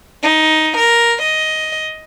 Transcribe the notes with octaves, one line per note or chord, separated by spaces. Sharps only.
D#4
A#4
D#5